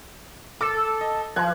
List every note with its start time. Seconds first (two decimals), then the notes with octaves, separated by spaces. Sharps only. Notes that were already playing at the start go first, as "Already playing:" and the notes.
0.61 A4 D6 E6
1.01 D#5
1.36 F3 F#6 G#6